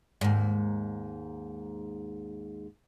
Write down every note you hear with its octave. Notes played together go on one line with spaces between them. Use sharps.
D#2 G#2